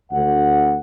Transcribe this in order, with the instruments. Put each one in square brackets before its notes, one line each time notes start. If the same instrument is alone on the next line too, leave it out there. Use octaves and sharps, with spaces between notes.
[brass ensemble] D2 F#5